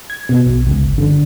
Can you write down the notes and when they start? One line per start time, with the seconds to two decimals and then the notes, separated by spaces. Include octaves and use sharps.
0.10 G#6
0.29 B2
0.47 B1
0.66 C#2
0.82 G1
0.98 D3